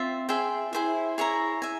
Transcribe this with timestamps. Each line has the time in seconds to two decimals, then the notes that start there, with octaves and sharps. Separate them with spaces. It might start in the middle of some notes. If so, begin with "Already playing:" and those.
Already playing: C4 F4 C5 E5
0.29 G#4 E5 G5 C6
0.73 E4 G#4 C5 E5
1.18 G#4 C#5 E5 A#5
1.62 E5 G#5